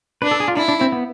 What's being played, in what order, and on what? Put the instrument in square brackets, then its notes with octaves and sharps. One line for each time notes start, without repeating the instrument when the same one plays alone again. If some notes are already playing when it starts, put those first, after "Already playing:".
[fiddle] D4 [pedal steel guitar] B4
[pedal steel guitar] A4
G#4
F4
[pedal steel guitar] D4 [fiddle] E4
[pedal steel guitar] D4
C4
B3